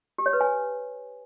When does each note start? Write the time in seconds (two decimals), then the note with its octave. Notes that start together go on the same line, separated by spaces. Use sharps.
0.18 G4
0.26 C#5
0.33 B4
0.41 G#5